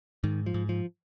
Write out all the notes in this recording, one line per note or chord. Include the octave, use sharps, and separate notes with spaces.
G#2 D#3
F3
G#2
F3